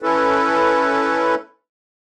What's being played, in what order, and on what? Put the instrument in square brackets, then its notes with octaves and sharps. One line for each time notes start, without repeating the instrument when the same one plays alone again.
[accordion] C#4 E4 A4 B4